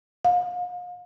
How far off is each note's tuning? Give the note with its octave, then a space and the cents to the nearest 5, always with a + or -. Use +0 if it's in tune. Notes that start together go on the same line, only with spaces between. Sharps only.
F5 +40